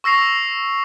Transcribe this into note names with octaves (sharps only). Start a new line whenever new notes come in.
C#6 E6 A#6 C7 F7